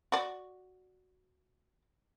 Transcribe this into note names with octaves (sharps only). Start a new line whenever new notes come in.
F#4 D5